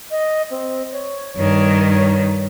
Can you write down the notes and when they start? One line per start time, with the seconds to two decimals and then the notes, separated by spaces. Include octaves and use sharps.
0.11 D#5
0.50 C4
0.92 C#5
1.36 G2 D#3 C#5